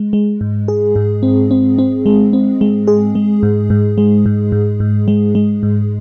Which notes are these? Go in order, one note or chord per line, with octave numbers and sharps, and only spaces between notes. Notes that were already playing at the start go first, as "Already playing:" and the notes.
Already playing: G#3
G#3
G#2
G#4
G#2
C4
C4
C4
G#3
C4
G#3
G#4
G#3
G#2
G#2
G#3
G#2
G#2
G#2
G#3
G#3
G#2